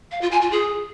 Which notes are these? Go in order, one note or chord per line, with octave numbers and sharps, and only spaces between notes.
F5
F4
G#5
F4
G#4